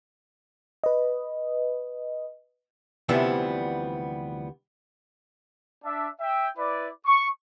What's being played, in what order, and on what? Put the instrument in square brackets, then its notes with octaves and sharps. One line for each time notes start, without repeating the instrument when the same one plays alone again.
[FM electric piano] B4 D#5
[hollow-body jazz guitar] D2 C3 E3 F3 G3 B3
[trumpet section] D4 E5
E5 G5
E4 B4 D5
C#6